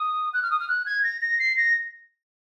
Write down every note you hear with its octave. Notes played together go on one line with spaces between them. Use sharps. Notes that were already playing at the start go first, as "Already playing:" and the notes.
Already playing: D#6
F#6
F6
D#6
F6
F#6
G#6
A#6
A#6
C7
A#6